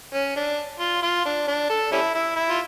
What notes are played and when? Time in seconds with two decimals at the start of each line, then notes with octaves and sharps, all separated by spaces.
0.13 C#4
0.36 D4
0.80 F4
1.02 F4
1.25 D4
1.47 D4
1.69 A4
1.92 G3 C#4 E4
2.14 E4
2.36 E4
2.49 F4